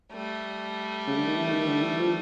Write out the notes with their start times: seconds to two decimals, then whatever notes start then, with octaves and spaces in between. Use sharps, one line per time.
0.11 G3 A3
1.07 C#3
1.17 D3
1.27 D#3
1.36 E3
1.52 D#3
1.67 D3
1.82 E3
1.99 F3